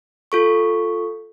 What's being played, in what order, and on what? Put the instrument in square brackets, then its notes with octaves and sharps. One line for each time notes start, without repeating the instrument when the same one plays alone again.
[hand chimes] F4 A4 C#6